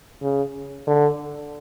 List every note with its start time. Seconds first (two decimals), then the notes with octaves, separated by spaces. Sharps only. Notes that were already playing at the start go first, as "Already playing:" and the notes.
0.22 C#3
0.87 D3